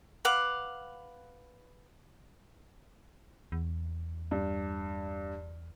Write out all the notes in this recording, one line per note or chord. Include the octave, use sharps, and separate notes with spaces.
B4 F5 F#5 D6
E2
G2